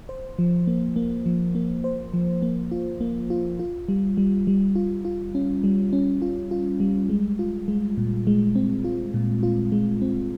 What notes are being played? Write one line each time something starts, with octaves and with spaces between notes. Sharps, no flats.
C5
F3
A#3
A#3
F3
A#3
C5
F3
A#3
F4
A#3
F4
F4
G3
G3
G3
F4
F4
C#4
G3
C#4
F4
F4
G3
G#3
F4
G#3
A#2
G#3
C4
F4
A#2
F4
G#3
C4